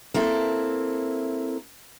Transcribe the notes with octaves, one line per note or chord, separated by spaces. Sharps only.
A#3 C4 E4 A4